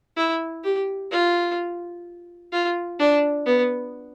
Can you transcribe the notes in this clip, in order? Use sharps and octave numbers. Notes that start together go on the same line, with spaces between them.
E4
G4
F4
F4
D4
B3